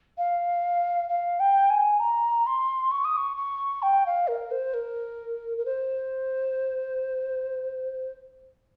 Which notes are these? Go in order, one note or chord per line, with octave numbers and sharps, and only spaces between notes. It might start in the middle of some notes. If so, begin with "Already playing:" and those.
F5
F5
G5
G#5
A#5
C6
C#6
D#6
C#6
C#6
G5
F5
A#4
C5
A#4
A#4
C5